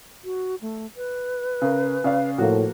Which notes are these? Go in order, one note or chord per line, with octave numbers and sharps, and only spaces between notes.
F#4
A3
B4
C#3 A#4
C#3 D5 F5
A2 F3 A#3 F#4